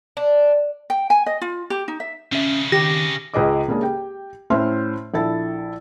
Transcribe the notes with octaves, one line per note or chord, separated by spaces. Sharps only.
D4
G5
G#5
D#5
F4
G4
D#4
E5
C#3 C#4 D4 E5
D#3 G4 A#6
C#2 G#4 B4 D#5 D6
C#3 G#3 A#3 C#4 D4 G#4
G4 G5
A2 C#4 C5 E5 C6 F6
A#1 E4 A4 A6